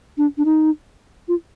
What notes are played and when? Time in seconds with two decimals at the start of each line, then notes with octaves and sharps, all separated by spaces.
0.18 D4
0.38 D4
0.45 D#4
1.28 F4